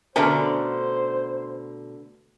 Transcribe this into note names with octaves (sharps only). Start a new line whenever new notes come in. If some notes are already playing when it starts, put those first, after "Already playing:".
B2 D3 A3 C#4 A#4 C5